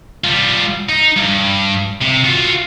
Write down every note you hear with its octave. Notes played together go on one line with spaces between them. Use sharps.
G3 F4
D#4
G2
C3
F4 F#4